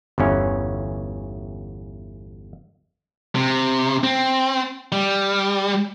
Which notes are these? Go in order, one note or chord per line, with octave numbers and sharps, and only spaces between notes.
G1 E2 E3 C#4
C3
C4
G3